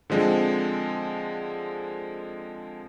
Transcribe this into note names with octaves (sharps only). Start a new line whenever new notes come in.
D3 F3 G#3 C4